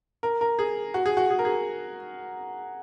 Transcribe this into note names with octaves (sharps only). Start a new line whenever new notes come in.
A#4
A#4
G#4
F#4
G#4
F#4
G#4
A#4
G#4